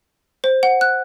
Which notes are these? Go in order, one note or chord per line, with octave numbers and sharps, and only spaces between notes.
C5
F#5
F#6